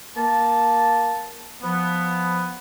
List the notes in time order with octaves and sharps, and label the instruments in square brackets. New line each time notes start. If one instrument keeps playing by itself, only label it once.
[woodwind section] A#3 A5
F3 B3